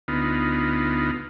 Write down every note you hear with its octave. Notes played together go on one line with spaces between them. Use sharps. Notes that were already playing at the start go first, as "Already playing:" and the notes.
D2 B3 D#4 F4